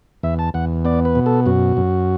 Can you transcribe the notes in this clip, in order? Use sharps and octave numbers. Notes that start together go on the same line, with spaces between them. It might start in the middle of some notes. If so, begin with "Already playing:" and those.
E2 E5
A5
E2 F#5
B3 D5
B4
B2
A4
F#2 F#4
F#2